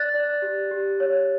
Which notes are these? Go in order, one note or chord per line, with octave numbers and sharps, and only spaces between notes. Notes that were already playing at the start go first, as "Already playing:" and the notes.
Already playing: D5 F#6 A6
D5
G4
G4
C#5